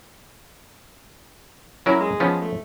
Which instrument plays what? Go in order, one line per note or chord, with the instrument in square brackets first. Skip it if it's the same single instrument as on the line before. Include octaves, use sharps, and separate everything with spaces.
[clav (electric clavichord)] F#3 C#4 A#4 [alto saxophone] E4
[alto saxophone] G#3
[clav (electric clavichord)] F3 B3 C#4
[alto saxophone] A3